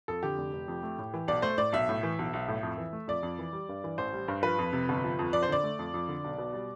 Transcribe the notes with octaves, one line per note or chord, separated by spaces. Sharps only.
F2 A4
D3 G4
F1
F1
F2
A3
A2
E3
B1 D5
A3 C5
A2 D5
B1 E5
A2
E3
B1
B1
A2
F2
E3
A3
F2 D5
F2
E3
G3
G2
E3
A1 C5
G3
G2
F3 B4
F2
C3
G1
F3
F2
F2 D5
C5
D3 D5
A3
F2
F2
D3
B1
B2
G3